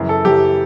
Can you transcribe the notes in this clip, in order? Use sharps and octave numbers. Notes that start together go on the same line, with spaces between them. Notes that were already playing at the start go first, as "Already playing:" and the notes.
Already playing: F#2 C#3 E3
A4
F#2 C#3 E3 G4